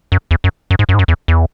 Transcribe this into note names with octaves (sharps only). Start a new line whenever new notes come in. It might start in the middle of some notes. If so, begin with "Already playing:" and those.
F#2
E2
F#2
F#2
G#2
F#2
G#2
F#2
E2
E2